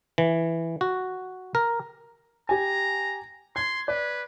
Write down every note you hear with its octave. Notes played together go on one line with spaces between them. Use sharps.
E3
F#4
A#4
G4 G#5 A#5
C6 G#6
B4 D5